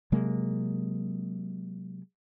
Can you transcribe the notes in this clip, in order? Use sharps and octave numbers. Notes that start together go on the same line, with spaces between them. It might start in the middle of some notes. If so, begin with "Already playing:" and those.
C3 F#3 G#3 A#3